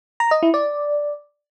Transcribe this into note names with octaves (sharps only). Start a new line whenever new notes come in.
A#5
D#5
E4
D5